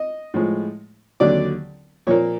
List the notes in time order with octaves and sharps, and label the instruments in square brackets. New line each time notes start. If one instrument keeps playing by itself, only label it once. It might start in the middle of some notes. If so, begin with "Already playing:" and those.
Already playing: [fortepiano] D#5
A2 F3 G#3
D#2 D3 F#3 D5
A#2 F3 A#3 C#5